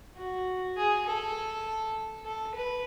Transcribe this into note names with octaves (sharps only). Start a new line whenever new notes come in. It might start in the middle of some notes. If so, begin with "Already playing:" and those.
F#4
G#4
A4
A4
B4